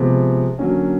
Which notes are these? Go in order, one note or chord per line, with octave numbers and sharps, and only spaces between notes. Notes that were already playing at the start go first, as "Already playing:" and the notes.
Already playing: C3 F3 G#3 B3
D3 F#3 A#3 C#4